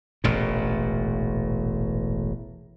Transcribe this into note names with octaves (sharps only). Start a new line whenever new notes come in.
E1 A1 A#2